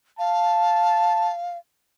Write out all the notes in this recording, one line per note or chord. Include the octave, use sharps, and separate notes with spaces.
F5 A5